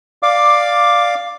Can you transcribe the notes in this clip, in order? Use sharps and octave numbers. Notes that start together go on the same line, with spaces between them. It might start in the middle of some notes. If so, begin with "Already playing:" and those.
D5 F5 D6